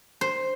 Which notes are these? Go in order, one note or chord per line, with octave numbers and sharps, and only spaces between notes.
C5